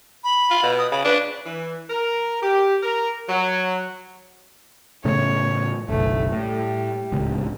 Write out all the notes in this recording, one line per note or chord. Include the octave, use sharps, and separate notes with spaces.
B5
F4
B2
D#6
C#3 B5
D4 B4
E3
A#4
G4
A#4
F#3
A2 C#3 A3 C#5
F#1 B1 A3
A2 G3
D1 C#2